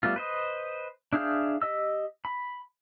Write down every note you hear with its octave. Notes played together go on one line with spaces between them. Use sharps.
G3 A3 B3 F4
B4 C5 D#5
D4 E4 G#4 F5 G6
G4 D#5 E6
B5